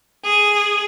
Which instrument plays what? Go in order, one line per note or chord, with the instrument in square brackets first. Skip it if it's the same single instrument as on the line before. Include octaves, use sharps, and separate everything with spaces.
[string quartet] G#4